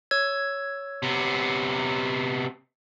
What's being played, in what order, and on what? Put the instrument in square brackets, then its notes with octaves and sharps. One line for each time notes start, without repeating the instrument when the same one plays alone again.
[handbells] C#5 E6 G#6
[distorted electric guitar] C3 B3